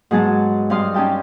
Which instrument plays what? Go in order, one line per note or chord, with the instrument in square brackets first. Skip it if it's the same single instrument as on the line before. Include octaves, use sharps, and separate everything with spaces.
[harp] G#2 F#3 G#3 B3 G#4 A5
G2 C4 F5 C6 D#6
C#4 D#4 G4 G5 A5